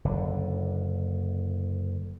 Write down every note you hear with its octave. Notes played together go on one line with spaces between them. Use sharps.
F#1 D3